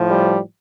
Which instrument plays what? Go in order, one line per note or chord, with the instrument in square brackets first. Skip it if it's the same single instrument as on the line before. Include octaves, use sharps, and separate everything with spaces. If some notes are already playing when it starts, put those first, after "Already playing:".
Already playing: [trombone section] A2 F3
G3